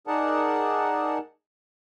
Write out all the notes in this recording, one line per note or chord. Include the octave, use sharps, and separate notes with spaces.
D#4 G#4 A#4 D5 F#5 A5